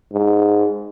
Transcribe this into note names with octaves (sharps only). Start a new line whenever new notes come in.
G#2